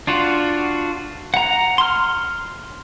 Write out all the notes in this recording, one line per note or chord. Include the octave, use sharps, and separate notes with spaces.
D4 F4 F#4
F#5 A#5
C6 F6